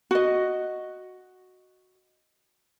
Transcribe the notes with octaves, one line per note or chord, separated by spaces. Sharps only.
F#4 D#5